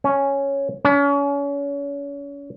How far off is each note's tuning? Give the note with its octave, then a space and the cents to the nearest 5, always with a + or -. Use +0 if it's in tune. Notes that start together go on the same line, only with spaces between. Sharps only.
C#4 +0
C#4 +35